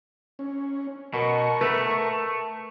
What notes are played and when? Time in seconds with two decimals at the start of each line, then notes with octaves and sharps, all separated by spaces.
0.39 C#4
1.14 B2 A#4 C#6
1.61 A3 B4